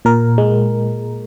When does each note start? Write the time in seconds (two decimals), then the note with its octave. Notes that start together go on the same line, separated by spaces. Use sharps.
0.05 A#2 A#4
0.38 G#3